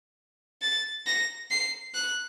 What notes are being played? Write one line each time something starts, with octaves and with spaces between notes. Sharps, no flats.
A6
A#6
C7
F#6